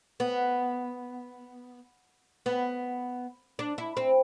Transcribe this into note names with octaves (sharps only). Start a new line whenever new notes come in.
B3
B3
D4
E4
C4